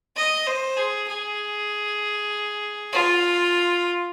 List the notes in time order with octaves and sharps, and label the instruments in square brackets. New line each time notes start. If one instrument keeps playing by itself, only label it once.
[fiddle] D#5
C5
G#4
G#4
F4